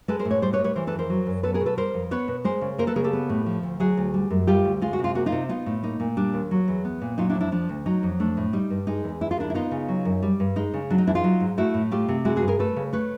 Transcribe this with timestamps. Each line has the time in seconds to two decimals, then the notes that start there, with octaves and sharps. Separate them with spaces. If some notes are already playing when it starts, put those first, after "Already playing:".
0.08 G#3 A4 B4
0.19 A#4 C5
0.25 A2
0.31 B4 C#5
0.42 G3 C5 D5
0.53 B4 C#5
0.59 A2
0.64 B4 C#5
0.75 E3 A#4 C5
0.87 A4 B4
0.93 F2
0.99 A#4 C5
1.10 F#3
1.27 F#2
1.43 B3 A4 B4
1.54 G#4 A#4
1.61 B2
1.66 A4 B4
1.77 G3 A#4 C5
1.94 F2
2.11 B3 B4 C#5
2.28 B2
2.44 G#3 A#4 C5
2.61 C#3
2.78 A#3 A#4 C5
2.87 A4 B4
2.96 C#3 G#4 A#4
3.04 G4 A4
3.13 B3
3.29 A2
3.46 F3
3.63 D2
3.80 F#3 F#4 G#4
3.97 D2
4.14 G3
4.30 F#2
4.47 G3 F4 G4
4.65 D2
4.81 G#3 F4
4.93 F#4
4.99 C3
5.04 F4
5.15 A#3 F#4
5.26 D#4 F4
5.32 C3
5.49 B3 D#4 F4
5.66 A2
5.83 A#3 D#4
6.00 A#2
6.17 G3 D4
6.34 D#2
6.51 F#3
6.68 E2
6.85 B3
7.01 A#2
7.18 F#3 D#4 F4
7.30 D4 E4
7.35 F2
7.41 D4 E4
7.52 F3 D4
7.69 D2
7.86 F#3 D#4
8.03 F2
8.20 A3 D4
8.37 A2
8.53 G3 D#4
8.70 G2
8.87 G#3 D#4
9.04 E2
9.21 G#3 E4
9.31 F4
9.38 D#2 D4 E4
9.50 E4
9.54 B3 D#4 F4
9.71 C#3
9.88 F#3
10.05 F#2
10.22 G3
10.40 G2
10.56 G#3 D#4
10.74 C#3
10.90 F#3 D4
10.98 D#4
11.07 E2 D4 E4
11.15 D#4 F4
11.24 F#3
11.40 G#2
11.57 A3 E4 F#4
11.74 A2
11.91 A3 F4 G4
12.08 C3
12.25 G#3 E4 F#4
12.36 F#4 G#4
12.42 G2
12.48 G#4 A#4
12.59 A3 A4 B4
12.76 C#3
12.93 A3 B4 C#5